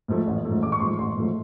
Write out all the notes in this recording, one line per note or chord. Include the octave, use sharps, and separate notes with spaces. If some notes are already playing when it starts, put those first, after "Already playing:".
G#2 F3 A3
A1
G#2 F3 A3
A1 D6
C#6
G#2 F3 A3 C6
A1 C6
G#2 F3 A3